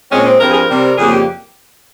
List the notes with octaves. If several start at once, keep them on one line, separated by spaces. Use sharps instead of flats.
A#2 G#3 C4 C#4
C4
G2 F3 C4 A#4
G#4
A#4
C3 G3 C4
F2 C#3 G3 A#3 G#4
G4